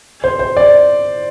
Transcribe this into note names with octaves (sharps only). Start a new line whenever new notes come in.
C5
C5
D5